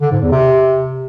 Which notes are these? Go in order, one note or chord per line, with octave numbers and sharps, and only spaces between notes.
D3
G#2
E2
C3